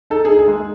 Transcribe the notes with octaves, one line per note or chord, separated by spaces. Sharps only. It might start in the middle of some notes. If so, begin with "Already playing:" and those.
D#4 A4
D#4 G#4
G#4
G#3